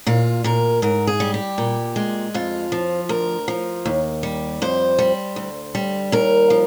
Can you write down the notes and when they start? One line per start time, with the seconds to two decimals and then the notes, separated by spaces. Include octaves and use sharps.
0.06 A#2 F4
0.44 A#2 A#4
0.82 G#2 A#4
1.07 G#4
1.20 G3
1.34 G4
1.58 A#2
1.96 G#3
2.34 F2 F4
2.72 F3
3.09 D2 A#4
3.48 F3
3.85 D#2
4.23 G3
4.62 F2 C5
4.99 G3
5.36 D2
5.75 G3
6.12 D#2 A#4
6.50 F3